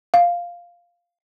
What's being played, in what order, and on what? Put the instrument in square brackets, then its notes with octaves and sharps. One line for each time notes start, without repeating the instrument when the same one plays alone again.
[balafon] F5